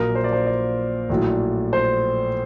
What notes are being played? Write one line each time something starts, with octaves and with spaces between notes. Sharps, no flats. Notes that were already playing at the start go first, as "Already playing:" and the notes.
Already playing: A#1 A#2 F#3 A#4
C5
D5
C5
D5
A#1 A2 F#3
C5